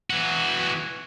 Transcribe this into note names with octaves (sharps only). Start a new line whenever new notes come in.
E3 F#4